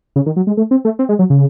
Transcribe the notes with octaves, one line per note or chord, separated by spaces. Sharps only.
C#3
D#3
F#3
G#3
A3
C4
A3
C4
G#3
F#3
C#3